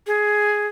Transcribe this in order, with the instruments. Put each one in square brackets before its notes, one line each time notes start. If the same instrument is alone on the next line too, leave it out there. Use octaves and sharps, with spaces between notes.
[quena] G#4